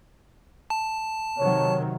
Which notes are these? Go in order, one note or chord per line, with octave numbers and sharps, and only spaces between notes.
A5
C3 D#3 F#3 C#5